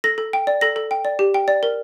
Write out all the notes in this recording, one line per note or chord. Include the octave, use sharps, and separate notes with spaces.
A4 A#6
A4
G5
D5
A4 A#6
A4
G5
D5
G4
G5
D5
A#4